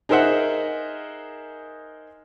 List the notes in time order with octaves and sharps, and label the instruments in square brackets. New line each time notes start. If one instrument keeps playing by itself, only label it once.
[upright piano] D#4 G#4 A#4 C5 E5 F#5